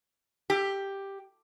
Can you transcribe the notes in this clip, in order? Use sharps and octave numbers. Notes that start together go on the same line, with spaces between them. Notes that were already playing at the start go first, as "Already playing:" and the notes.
G4